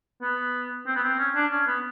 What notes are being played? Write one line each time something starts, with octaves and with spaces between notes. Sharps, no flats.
B3
C4
B3
C4
C#4
D4
C#4
B3